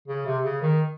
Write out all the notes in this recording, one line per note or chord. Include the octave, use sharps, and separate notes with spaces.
C#3
C3
C#3
D#3